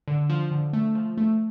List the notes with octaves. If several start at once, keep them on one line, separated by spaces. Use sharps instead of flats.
D3
F3
D3
A3
F3
A3